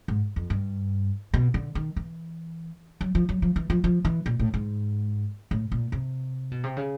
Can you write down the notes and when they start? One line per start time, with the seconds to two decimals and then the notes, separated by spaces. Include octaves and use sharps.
0.08 G#2
0.36 F2
0.50 G2
1.34 B2
1.54 D3
1.75 D#3
1.96 E3
3.01 F#3
3.15 F3
3.29 F#3
3.42 F3
3.56 E3
3.70 F3
3.84 F3
4.05 E3
4.26 A#2
4.39 A2
4.54 G#2
5.51 A2
5.72 A#2
5.92 C3
6.51 B2
6.64 C3
6.76 C#3